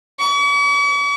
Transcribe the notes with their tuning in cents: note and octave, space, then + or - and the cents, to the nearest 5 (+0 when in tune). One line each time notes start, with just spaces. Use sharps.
C#6 +45